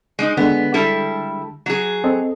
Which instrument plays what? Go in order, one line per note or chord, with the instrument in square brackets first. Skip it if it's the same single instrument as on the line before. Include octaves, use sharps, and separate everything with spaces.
[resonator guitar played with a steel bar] G#3 D#4
[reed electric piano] D3 G#3 [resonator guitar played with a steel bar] B3
[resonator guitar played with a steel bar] G3 E4 A4
F#3 G#4
[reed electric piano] C4 A4 D#5